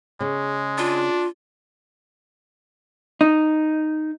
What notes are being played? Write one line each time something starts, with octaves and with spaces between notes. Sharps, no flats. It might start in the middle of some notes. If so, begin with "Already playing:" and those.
C#3 G#3
D4 F4
D#4